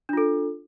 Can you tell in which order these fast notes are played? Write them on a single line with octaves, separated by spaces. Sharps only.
D4 F4 A4